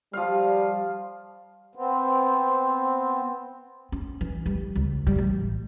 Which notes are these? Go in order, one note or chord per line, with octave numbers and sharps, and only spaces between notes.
F3 G3 F5
B3 C4
C#4
E3
G3
C#2
G3
A1